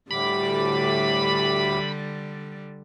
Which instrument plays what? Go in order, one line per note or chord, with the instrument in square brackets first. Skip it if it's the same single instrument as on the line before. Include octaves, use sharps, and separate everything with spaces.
[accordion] D2 A2 D6 [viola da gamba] D3 G3 [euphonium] G4 [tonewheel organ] B5